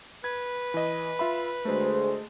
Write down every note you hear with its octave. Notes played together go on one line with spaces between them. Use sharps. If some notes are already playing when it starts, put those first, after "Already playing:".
B4 G#6
E3 D#5
F4 E5 B5
D2 G#3 A3 G#4 C5